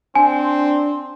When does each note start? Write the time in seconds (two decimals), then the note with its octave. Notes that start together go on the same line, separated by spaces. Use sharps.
0.15 C4 D4 G#5 C6